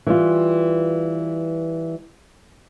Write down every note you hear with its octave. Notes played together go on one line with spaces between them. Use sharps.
E3 G3 F4